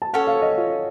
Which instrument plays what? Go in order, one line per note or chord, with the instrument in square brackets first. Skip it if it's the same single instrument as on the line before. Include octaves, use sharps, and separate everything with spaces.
[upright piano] A5
[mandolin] C#4 A4 C#5 [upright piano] F#5
[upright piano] F5
D#5
F4